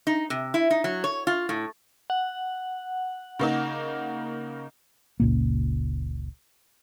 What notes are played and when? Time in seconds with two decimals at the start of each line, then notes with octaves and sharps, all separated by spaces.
0.07 D#4
0.30 C3
0.54 E4
0.70 D#4
0.84 F#3
1.04 C#5
1.27 F4
1.49 A2
2.10 F#5
3.39 C#3 A#3 D#4
5.20 F#1 C#2 A#2 A#3